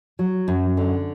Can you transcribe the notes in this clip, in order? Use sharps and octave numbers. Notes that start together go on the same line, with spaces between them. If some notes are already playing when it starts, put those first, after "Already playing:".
F#3
F#2
D3